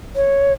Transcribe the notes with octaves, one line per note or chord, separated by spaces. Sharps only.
C#5